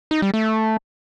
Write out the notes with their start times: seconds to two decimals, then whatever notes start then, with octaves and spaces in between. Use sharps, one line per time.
0.11 D#4
0.22 G3
0.34 A3